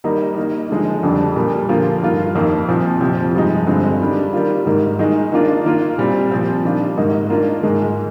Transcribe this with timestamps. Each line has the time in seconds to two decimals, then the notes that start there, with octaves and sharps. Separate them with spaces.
0.04 D#3 G3 A#3 D#4
0.37 D#3 A#3 D#4
0.70 D3 F3 G#3 D#4
1.03 F2 D3 G3 D4
1.36 A#2 G3 A#3
1.69 D3 F3 A#3 F4
2.02 G2 D#3 A#3 F4
2.35 F2 D#3 A#3
2.68 A#2 F3 C4
3.01 F2 C3 F3 C4
3.35 G2 F3 G#3 D#4
3.67 G2 D3 G#3 C4
4.00 D#3 G3 D4
4.33 D#3 G3 A#3 F4
4.66 G#2 D#3 A#3
4.99 D#3 G#3 D#4
5.32 D#3 A#3 D4 F4
5.65 D#3 A#3 F4
5.98 A#2 G3 C4
6.32 A#2 F3 C4
6.64 D#3 G3 D4 F4
6.97 G#2 D#3 A#3 D#4
7.30 D#3 A#3 D4 F4
7.63 G#2 D#3 G#3